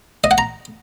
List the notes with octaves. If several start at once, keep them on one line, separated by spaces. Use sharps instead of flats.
D#5
F#5
A#5